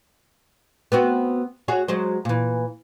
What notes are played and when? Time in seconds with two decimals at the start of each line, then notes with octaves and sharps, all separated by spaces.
0.92 B3 C4 F#4
1.68 F#4 G#4 C#5
1.88 F#3 G#3 C5
2.25 A#2 E3